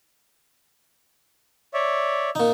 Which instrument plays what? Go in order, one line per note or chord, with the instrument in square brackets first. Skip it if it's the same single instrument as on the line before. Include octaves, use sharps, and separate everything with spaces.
[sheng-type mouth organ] C#5 D5 E5
[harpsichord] A#2 D#4